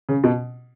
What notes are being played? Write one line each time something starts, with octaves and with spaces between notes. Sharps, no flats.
C#3
B2